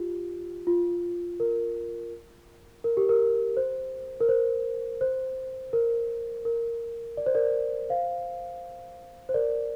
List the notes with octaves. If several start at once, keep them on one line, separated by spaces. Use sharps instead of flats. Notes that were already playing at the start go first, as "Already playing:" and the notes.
Already playing: F4 G4
F4
A#4
A#4
G4
A#4
C5
A#4
C5
C5
A#4
A#4
D5
C5
A#4 D5
C5 F5
C5
A#4 D5